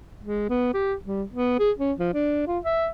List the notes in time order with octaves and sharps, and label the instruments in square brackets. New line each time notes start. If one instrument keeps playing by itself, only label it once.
[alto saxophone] G#3
B3
G4
G3
B3
G#4
C#4
F3
D4
F4
E5